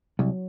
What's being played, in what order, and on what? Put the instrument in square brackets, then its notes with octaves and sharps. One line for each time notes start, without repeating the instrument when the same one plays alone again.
[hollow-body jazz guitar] C2 [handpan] F#3